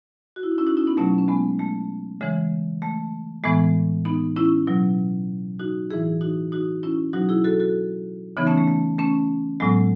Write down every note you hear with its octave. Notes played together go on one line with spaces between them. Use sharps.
F#4
E4
D#4
C#4 E4
D#4 F#4
C#4 E4
B3 D#4
B2 F#3 A3 C#4
C#4
G#3 B3
A3
C#3 E3 G#3
A3
A2 E3 G#3 B3
B3 D#4
C#4 E4
B2 F#3
D#4 F#4
A2 E3 E4 G#4
D#4 F#4
D#4 F#4
C#4 E4
B2 F#3 D#4 F#4
E4 G#4
F#4 A4
F#4 A4
C#3 E3 B3 D#4
A3 C#4
A3
A3
A3 C#4
A2 F#3 G#3 B3